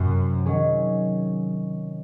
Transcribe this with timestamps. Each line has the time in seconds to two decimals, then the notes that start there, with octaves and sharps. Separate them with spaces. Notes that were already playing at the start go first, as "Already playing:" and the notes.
Already playing: F#2 C3 F#3 C4
0.46 D#3 F#3 C#4 G#4